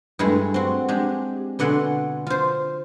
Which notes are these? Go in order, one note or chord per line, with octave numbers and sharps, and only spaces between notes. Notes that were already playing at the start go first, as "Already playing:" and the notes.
G2 G#3 A3 E4
C4 F#4
G#3 D4 G4
B2 D3 D5 F#5 G#5 C6
F4 C5